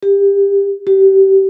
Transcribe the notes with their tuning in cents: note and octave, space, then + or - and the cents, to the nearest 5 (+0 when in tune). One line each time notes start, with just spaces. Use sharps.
G4 +25
G4 -25